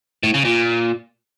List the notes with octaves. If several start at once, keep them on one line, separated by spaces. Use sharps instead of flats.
A2
C#3
A#2